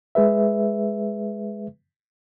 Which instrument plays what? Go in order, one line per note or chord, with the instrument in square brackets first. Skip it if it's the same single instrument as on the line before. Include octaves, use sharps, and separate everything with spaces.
[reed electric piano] G#3 G#4 B4 E5